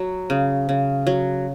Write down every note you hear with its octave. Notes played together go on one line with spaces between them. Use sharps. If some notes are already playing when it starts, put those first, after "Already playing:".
Already playing: F#3
C#3
C#3
F#3